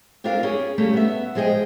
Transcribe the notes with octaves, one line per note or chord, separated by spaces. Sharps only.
C4 D4 F4 A#4 F5
C#4 G#4
G3 A3 A#3 C#4
B3 E5
F3 G#3 G#4 D#5 G5